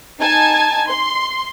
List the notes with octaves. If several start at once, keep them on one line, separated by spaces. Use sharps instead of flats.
D#4 G#5 A5 G#6
C6